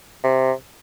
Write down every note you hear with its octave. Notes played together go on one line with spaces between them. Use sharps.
C3